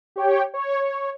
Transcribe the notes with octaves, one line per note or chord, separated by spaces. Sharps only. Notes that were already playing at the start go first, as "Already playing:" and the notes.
G4 C#5 G5
C#5